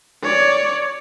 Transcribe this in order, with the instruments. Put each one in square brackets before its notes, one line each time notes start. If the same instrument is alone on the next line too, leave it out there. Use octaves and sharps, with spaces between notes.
[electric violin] C#5 D5